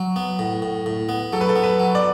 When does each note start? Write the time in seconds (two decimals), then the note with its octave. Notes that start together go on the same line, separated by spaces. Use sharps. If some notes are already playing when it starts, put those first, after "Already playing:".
Already playing: F#3
0.16 B3
0.39 A2
0.62 A2
0.86 A2
1.09 B3
1.33 F#3 A4
1.41 B4
1.49 A4
1.56 B3
1.63 B4
1.80 F#3
1.95 D5